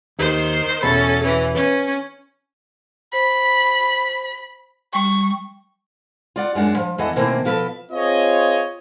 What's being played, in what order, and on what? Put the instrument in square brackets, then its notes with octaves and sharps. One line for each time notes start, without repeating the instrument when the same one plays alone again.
[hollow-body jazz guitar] D#2 [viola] D#3 C5
[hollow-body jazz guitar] E2 B2 B5 [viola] C#4 A4
[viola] E3 C#4
[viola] C#4 [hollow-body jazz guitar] B4 C#5
[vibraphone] C5 [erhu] B5
[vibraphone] G3 G5 [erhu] C#6
[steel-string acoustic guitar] F4 D5 F#5
F#2 G#3 D4 F#5
F3
E2 E3 A4 D#5 F#5
B2 D#3 E3 A3 A#3 C4
B2 F3 A4 B4
[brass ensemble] C4 F4 G#4 C#5 D#5